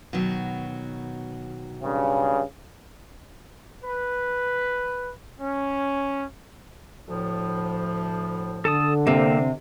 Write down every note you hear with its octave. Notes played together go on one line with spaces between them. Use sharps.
B2 D#3 F#3
G2 C#3
B4
C#4
D2 A2 F3
D3 A4 A5 D#6
C3 A#3 C4 G4 C5 F5